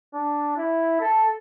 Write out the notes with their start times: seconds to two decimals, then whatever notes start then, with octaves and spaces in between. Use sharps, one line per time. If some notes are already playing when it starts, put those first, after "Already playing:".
0.14 D4
0.57 E4
1.00 A4